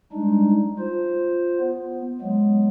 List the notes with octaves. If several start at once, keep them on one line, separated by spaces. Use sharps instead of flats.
G3 G#3 D4 D#4
F4 C5
B3
F#3 G#3 B3